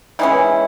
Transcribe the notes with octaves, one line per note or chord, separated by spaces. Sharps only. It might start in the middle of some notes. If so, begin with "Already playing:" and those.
E3 G#3 C#4 E4